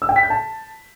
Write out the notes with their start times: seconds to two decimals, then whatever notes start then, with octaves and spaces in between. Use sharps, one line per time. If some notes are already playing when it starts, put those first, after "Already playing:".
0.02 E6
0.09 G5
0.16 B6
0.23 G6
0.30 A5